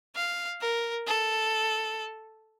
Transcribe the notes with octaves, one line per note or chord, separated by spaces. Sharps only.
F5
A#4
A4